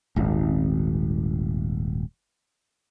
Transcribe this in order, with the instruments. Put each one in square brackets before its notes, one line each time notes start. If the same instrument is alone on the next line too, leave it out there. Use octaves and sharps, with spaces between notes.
[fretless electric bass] D#1 G#1